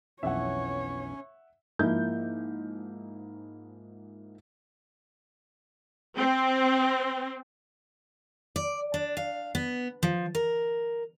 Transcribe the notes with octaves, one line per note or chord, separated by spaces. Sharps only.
B1 F2 E3 C#4 C#5 E5 F#5
G#2 F3 A#3 E4 G6
C4
D5
D4
F5
B3
F3
A#4